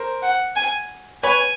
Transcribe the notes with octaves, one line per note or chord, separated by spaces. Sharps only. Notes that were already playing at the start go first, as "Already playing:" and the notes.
Already playing: A#4 C5
F#5
G#5
B4 C#5 G#5